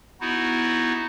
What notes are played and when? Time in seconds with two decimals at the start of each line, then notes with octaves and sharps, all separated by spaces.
0.21 B3 D#4 E4 F#4